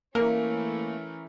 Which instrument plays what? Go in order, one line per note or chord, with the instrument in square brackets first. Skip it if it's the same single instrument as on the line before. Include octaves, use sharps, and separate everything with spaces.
[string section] E3 A3 C#4 [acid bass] A#3 [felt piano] A#4